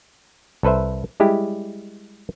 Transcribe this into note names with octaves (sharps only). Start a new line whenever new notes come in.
C2 A4 B4 C5 E5
G3 G#3 E4 G4